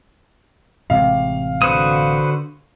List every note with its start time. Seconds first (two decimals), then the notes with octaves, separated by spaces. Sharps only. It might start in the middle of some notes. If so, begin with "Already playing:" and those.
0.90 A1 C3 G#3 F5
1.62 D3 F#4 B4 C5 D#6